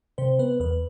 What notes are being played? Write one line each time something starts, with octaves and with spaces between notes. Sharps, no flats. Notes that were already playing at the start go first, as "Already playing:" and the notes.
C3 C5
B3 B4
E2 B4